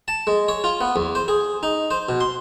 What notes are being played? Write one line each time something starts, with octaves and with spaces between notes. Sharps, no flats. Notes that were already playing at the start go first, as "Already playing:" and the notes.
A5
G#3
C#5
F4
B3
E2
C5
G#4
D#4
C5
B2
C6